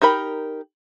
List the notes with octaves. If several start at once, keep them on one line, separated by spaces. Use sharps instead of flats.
D#4 G4 A#4 B5